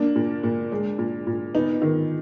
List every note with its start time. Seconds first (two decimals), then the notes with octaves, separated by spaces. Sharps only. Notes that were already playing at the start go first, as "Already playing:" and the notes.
Already playing: A#3 D4
0.15 A#2
0.43 A#2
0.72 G#3
0.98 A#2
1.27 A#2
1.55 B3 D#4
1.82 D#3